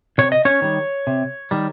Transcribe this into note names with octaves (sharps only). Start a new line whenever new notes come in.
C3 C#5
D#5
C#4 C#5
D#3 G3
C3
D#3 G3